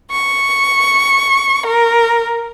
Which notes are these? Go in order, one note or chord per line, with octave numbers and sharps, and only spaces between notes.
C#6
A#4